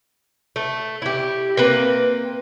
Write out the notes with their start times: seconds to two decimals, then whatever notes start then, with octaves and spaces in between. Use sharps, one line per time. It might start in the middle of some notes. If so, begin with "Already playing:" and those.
0.56 A3
1.02 E4 G4
1.57 A#3 C4 B4